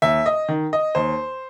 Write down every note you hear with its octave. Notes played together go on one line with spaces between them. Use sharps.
D#2 E5
D#5
D#3
D#5
D#2 C5